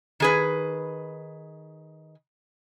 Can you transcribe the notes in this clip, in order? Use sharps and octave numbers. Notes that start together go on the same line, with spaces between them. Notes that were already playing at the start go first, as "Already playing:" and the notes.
D#3 G#4 B4